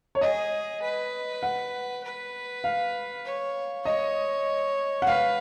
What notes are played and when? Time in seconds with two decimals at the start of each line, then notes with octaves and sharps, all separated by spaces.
0.15 C#5
0.21 G#4 D#5
0.82 B4
1.43 F#5
2.03 B4
2.64 F5
3.25 C#5
3.85 C#5 D#5
5.02 F#5
5.06 B4 F5